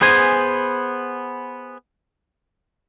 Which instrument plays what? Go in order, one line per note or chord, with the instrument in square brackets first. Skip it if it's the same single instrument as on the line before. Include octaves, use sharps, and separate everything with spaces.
[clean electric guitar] B3 G#4 C5 G#5